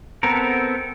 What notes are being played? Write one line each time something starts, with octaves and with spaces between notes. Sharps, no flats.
B3 C4 A4 A#4